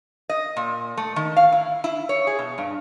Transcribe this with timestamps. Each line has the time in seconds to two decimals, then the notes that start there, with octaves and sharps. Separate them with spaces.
0.29 D#5
0.57 A#2
0.97 A3
1.16 D#3
1.37 F5
1.52 E4
1.84 E4
2.09 C#5
2.27 G#4
2.39 B2
2.58 G2